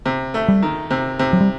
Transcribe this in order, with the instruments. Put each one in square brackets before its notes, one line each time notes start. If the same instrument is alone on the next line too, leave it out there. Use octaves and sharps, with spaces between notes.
[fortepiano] C3
A3
[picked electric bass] G3
[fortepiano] D#3
C3
C3
[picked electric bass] F#3
G3